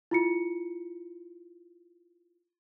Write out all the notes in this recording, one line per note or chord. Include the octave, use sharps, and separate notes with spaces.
E4 F4 C#7